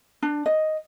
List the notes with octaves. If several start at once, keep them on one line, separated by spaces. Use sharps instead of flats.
D4
D#5